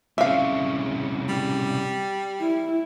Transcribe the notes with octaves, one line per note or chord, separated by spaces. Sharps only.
C2 C#3 E5 F5
G3
E4